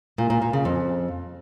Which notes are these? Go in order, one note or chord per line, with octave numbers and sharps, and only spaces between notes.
A#2
A#2
A#2
C#3
F2